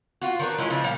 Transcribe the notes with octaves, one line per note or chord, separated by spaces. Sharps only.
F4 F#4
D#3 D4 B4
G#3 C#4 E4 F4
C#3 F3 D4
A#2 G3 F5